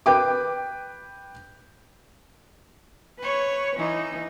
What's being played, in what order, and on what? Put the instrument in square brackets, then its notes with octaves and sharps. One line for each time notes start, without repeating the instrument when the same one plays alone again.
[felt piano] B4 G5 D6
[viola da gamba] B4 C#5
E3 D#4